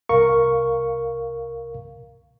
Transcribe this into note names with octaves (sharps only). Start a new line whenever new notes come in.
C2 A#4 F5 C#6